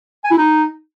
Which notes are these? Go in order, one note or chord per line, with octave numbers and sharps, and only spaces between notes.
G#5
E4
D#4